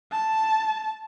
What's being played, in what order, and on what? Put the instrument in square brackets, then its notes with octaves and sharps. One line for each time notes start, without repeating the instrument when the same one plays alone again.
[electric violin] A5